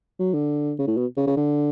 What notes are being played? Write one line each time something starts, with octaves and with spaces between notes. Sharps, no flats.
F#3
D3
C#3
A2
B2
C#3
C#3
D3